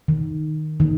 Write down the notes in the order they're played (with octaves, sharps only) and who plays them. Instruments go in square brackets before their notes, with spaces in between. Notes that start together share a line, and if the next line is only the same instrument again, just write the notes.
[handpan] D#3
D#3